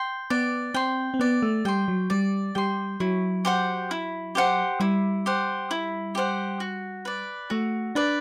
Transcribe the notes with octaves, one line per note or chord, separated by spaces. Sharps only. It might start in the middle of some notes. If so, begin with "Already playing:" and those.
Already playing: G5 C6
B3 D5
C4 G5 C6
C4
B3 D5
A3
G3 G5 C6
F#3
G3 D5
G3 G5 C6
F#3 E4
G4 C5 F#5
E4
G4 C5 F#5
G3 E4
G4 C5 F#5
E4
G4 C5 F#5
F#4
B4 D5
A3 F#4
D4 B4 D5